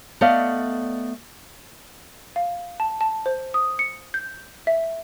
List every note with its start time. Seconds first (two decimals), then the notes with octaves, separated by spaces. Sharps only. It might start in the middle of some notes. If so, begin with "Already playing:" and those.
0.21 A3 B3 D5 D#5 F5
2.36 F5
2.80 A5
3.01 A5
3.26 C5
3.54 D#6
3.79 C#7
4.14 G6
4.67 E5